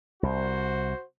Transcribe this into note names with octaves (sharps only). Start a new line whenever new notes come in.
C2 F#4 C5